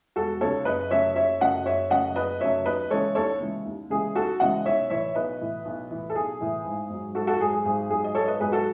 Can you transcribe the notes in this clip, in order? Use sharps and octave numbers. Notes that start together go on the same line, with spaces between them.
E1 F#4 A4
D#2 C#3 A4 C#5
F#1 B4 D#5
F#2 C#3 F#3 A3 C#5 E5
F#1 C#5 E5
F#2 C#3 F#3 A3 D#5 F#5
F#1 C#5 E5
F#2 C#3 F#3 A3 D#5 F#5
F#1 B4 D#5
F#2 C#3 F#3 A3 C#5 E5
D#2 B4 D#5
C#3 E3 G#3 A4 C#5
D#2 A4 C#5
C#3 E3 G#3
D#2
C#3 E3 G#3 G#4
D#2 F#4 A4
C#3 E3 G#3 D#5 F#5
B1 C#5 E5
A2 E3 C#5 E5
B1 B4 D#5
A2 E3
B1
A2 E3
A4
B1 G#4
A2 E3
G#1
G#2 F#3
G#1 F#4 A4
F#4 A4
G#2 F#3 G#4
G#4
G#1 G#4
G#2 F#3 G#4
D#5
G#1 A4 C#5
B4 D#5
G#2 F#3 G#4 B4
F#4 A4